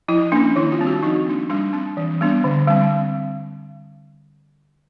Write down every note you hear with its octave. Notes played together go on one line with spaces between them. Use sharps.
F3 E4
A#3 C#4 D4
D#3 E4
F4
G3 C4
F#4
F3 D#4
A#3 D4
G3 D4
C4
E3
G3 B3 D4
D3
G3 C4